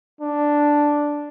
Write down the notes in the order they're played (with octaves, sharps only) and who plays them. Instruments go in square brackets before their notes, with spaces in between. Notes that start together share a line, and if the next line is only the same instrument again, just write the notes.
[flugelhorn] D4